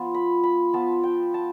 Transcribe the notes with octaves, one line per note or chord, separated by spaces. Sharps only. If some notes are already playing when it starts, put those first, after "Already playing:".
Already playing: F3 B3 F4
B5
B5
F3 B3 F4 A5
G5
A5